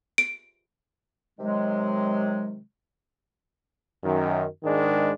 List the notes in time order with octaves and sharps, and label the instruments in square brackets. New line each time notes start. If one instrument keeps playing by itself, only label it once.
[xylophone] D7
[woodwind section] C3 D#3 F#3 G#3
[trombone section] F#2 D#3
G#2 D#3 G#3 D4